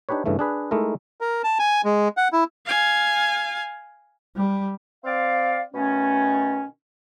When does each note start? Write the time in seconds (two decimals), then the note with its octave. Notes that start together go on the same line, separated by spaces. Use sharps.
0.09 D4 D#4 G4 B4 C#5
0.26 G2 C#3 E3 A3
0.39 D4 G#4 B4
0.71 G#3 A3 D#4 E4 A#4
1.21 A#4
1.44 A5
1.59 G#5
1.85 G#3
2.17 F#5
2.33 E4
2.66 F5 G#5
4.36 G3
5.04 C4 D5 F5
5.74 B2 D#3 A3 C#4